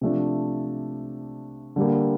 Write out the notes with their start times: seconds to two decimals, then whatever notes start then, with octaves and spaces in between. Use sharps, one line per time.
0.01 C3 F3 A3 D4
1.76 D3 G3 A#3